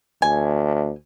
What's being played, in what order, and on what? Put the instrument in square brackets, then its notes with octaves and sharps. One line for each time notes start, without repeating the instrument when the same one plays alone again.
[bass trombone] D2 [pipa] G#5